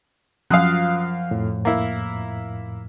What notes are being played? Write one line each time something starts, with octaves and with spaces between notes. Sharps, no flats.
F#2 F3 F5 D#6 F#6
F2 A2
A#3 E4